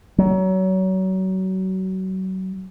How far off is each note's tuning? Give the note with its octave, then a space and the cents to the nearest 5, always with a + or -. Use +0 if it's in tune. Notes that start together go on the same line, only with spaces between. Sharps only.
F#3 +30